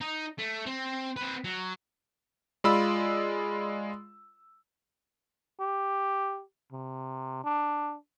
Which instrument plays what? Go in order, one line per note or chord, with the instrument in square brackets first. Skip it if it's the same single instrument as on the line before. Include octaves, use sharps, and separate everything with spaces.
[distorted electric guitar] D#4
A3
C4
C4 B4
F#3
[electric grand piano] G#3 F4 D5 B5 E6
[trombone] G4
C3
D4